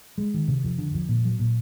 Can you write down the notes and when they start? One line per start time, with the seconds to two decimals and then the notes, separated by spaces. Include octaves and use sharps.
0.18 G#3
0.34 D#3
0.48 C3
0.64 F2
0.78 D3
0.94 F2
1.09 A#2
1.25 F#3
1.39 A#2